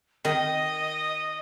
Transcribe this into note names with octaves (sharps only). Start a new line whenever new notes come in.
D#3 D#5